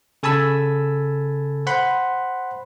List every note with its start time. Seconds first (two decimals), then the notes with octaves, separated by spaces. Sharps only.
0.23 C#3 A4 G#5 A5 B5 E6
1.67 C5 F#5 B5 C6